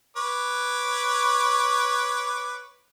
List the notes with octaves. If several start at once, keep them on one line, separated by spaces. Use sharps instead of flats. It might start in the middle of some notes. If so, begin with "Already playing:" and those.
B4 C#5 D6